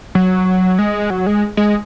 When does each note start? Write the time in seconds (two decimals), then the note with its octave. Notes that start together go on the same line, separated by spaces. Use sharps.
0.15 F#3
0.79 G#3
1.10 F#3
1.27 G#3
1.57 G#3